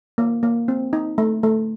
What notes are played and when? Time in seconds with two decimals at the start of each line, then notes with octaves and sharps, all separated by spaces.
0.18 A#3
0.43 A#3
0.68 C4
0.93 D#4
1.18 A3
1.43 A3